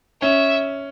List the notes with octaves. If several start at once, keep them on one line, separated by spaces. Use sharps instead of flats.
C#4 E5